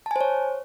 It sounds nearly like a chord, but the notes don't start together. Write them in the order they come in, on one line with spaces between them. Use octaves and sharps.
A5 G#5 C5 C#5